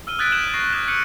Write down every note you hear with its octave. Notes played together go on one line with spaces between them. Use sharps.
E6 F6 D#7 G7
D#6 F#6 G#6 A6 B6 D7
D#6 F6 G6 E7 F#7
C#6 A#6 C7
D6 D#6 F#6 G#6 E7
C#6 F#6 G6 C#7 D#7 F#7